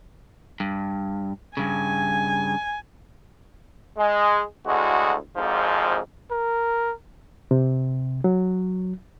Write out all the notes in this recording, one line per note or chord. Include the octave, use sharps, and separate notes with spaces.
G2
G2 C#3 G#5
G#3
D2 A2 G#3 F#4
G#1 F2 G#2 F3
A#4
C3
F#3